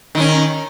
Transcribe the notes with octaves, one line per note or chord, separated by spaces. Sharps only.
D#3 C#4 E4